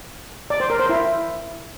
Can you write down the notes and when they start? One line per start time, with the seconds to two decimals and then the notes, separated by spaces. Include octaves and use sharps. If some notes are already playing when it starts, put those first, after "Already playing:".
0.50 D5
0.60 C5
0.70 A#4
0.80 C5
0.89 E4